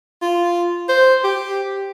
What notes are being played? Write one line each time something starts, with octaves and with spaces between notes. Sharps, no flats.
F4
C5
G4